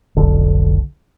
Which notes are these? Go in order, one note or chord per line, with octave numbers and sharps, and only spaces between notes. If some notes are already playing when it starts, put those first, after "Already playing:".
F1 B1 D3